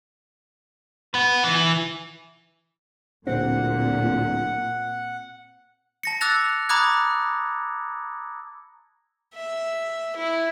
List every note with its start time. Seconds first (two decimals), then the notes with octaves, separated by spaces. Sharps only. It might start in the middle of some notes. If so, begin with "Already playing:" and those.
1.14 B3 B4
1.44 E3
3.27 D1 A#2 C4 F#5
6.03 A5 A#6 C#7
6.21 D6 E6 F#6 A6 A#6 F7
6.69 A#5 B5 D6 D#6 F#6 G#6
9.35 E5
10.16 E4